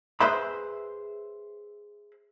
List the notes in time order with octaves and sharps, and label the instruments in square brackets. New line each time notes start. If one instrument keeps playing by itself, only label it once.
[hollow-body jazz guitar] G#4 B4 C5 E5 B5